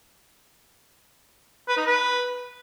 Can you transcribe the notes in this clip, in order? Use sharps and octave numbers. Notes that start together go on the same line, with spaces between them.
B4
D#4
B4